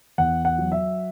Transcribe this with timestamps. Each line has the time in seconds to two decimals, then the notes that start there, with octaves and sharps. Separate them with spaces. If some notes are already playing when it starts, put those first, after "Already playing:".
0.18 E2 F#5
0.45 F#5
0.58 F#3
0.72 E5